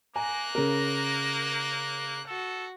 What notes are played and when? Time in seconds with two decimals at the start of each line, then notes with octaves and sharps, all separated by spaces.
0.16 A#3 G#5 A#5 F#6 A#6
0.55 C#3 A#4
2.27 F#4 A4